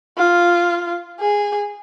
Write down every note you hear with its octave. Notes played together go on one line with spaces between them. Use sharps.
F4
G#4